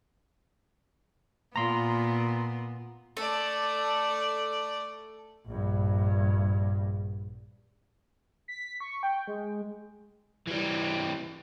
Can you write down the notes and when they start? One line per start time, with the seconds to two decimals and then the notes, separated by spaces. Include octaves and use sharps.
1.56 A#2 B3 A#5 C6
3.17 A3 A4 D5
5.47 A#1 G2
8.48 B6
8.80 C#6
9.03 G5
9.28 G#3
10.47 E3 G3